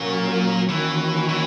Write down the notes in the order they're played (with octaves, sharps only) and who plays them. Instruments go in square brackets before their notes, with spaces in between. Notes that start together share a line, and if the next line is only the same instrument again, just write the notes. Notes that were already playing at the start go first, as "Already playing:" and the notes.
Already playing: [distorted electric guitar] A#2 [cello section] F#3 A#3 C#4 F#4 A#4
[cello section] D#3 A#3 C#4 F#4 [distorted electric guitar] E3
[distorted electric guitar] E3